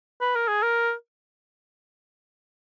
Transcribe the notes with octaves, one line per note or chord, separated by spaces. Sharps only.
B4
A#4
G#4
A#4